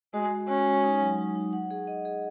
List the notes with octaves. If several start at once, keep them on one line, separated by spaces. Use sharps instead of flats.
G#3 F#4
G#3
C#4 F#4
G#3
D#4
F#3
D#4
D#4
F#5
G#4
D#5
G#4